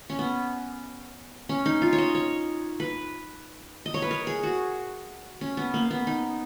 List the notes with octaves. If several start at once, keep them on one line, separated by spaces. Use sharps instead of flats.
C#4
B3
C#4
D#4
F4
C#5
D#5
C#5
B4
D#5
C#5
B4
A#4
G#4
F#4
C#4
B3
A#3
B3
D#4